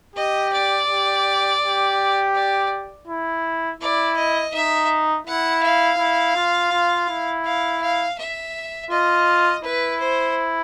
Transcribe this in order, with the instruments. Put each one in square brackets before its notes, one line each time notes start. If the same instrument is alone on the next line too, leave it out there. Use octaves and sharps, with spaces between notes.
[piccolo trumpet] G4 [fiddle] D#5
[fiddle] D5
[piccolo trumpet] G4
G4
[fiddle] D5
[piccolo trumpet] E4
[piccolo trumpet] E4 [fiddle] D5
[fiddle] D#5
[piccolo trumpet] D#4 [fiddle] E5
[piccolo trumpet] E4 [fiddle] F#5
[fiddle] F5
[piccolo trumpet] E4
F4
F4
E4
[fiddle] F5
F5
E5
[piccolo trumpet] F4 [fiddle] D#5
[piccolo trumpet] E4 [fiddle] B4
[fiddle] C5